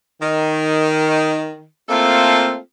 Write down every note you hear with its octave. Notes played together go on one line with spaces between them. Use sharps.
D#3
A3 A#3 C4 E4 F4 A4